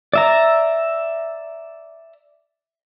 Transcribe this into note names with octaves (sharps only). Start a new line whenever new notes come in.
D5 E5 A#5